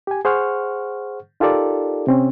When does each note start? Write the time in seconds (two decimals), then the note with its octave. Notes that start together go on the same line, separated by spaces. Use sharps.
0.07 G4 G#5
0.25 G#4 C5 F#5 C#6 F6
1.40 D#4 F4 G4 A4 A#4 D5
2.07 C3 C4 C#4